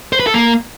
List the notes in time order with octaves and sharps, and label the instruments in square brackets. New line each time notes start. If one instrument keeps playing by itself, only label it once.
[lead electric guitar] C5
B4
A4
A#3